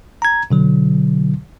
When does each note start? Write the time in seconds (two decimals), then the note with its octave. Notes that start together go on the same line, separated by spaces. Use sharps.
0.22 A#5 G#6
0.51 B2 D3 F#3